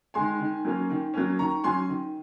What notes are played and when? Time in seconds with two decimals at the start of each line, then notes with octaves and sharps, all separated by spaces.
0.14 D#3 G#3 G#5 C6
0.40 D#3
0.65 F#3 A#3 C#4
0.90 D#3
1.14 F#3 A#3 C#4
1.39 D#3 A#5 C#6
1.64 F#3 C#4 G#5 C6
1.89 D#3